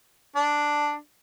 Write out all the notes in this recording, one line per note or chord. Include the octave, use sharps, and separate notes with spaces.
D4